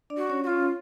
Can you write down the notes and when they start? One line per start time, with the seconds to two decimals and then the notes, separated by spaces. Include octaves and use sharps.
0.10 D4 D5
0.18 F#4
0.29 C#4 C#5
0.43 F#4
0.47 C#4 F4 C#5